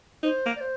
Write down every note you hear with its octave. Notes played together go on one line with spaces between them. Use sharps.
D#4 C5
A#3
D5
C5